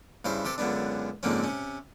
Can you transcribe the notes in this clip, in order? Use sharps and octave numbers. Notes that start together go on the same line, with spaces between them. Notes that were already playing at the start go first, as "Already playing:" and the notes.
G2 C#3 E4 C5 F5
C3 G4 A4 C5
C#2 F#2 D3 B3 D4
F2 G#2 D3 A#3 C4 C#4
C3 C#4